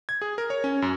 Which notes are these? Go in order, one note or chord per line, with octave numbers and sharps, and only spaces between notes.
G#6
G#4
A#4
C#5
C#4
F#2